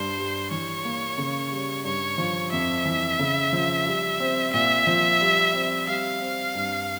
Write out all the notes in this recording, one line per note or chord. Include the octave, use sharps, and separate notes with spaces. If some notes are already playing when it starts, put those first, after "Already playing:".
Already playing: G2 C5
G3
E3 C#5
A#3
C#3
G3
G2 C#5
F3
F2 E5
E3
C#3
F3
G3
C4
A#2 E5
F3
G3
C4
G3 F5
C4
G2